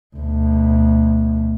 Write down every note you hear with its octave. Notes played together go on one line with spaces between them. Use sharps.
D2 B2